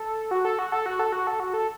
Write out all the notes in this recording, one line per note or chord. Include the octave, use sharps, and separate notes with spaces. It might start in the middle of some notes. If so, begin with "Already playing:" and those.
Already playing: A4
F#4
A4
F#4
A4
F#4
A4
F#4
A4
F#4
A4